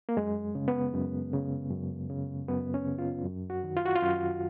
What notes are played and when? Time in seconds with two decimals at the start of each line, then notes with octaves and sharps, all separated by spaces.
0.09 A#3
0.17 F#2 G#3
0.55 C#3
0.68 B3
0.94 F#2
1.33 C#3
1.71 F#2
2.10 C#3
2.48 F#2 B3
2.74 C#4
2.86 C#3
2.98 F4
3.25 F#2
3.50 F#4
3.64 D#3
3.77 F4
3.85 F#4
3.95 F4
4.02 F#2